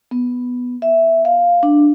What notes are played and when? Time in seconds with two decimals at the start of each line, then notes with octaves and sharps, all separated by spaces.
0.11 B3
0.82 E5
1.25 F5
1.63 D4